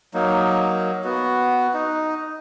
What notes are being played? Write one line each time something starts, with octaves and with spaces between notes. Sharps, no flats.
F#3 A#3 D#4
B3 F#4
D#4